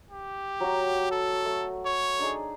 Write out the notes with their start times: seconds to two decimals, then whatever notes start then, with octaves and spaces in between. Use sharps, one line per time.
0.11 G4
0.60 F#3 F#4
1.11 A4
1.45 A3
1.86 C#5
2.19 D4 D#4 G#4